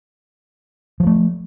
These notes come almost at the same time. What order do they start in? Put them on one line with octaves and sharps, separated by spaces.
F3 F#3 A3